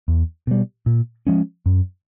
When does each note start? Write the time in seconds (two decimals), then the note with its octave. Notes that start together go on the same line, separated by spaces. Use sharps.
0.08 E2
0.47 B2 G3
0.86 A#2
1.27 F3 G#3 C#4
1.66 F#2